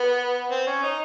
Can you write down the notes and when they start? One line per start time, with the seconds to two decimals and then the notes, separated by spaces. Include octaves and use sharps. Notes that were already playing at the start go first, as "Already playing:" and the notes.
Already playing: B3
0.51 C4
0.67 C#4
0.83 D#4